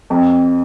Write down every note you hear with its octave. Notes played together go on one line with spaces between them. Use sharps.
F2